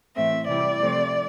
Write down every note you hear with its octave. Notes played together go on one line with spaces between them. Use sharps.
A2 E3 A3 C4 E5
C3 E3 G3 D5
C3 F3 A3 C4